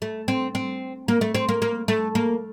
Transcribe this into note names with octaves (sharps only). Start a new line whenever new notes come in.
A3
C4
C4
A#3
A3
C4
A#3
A#3
A3
A#3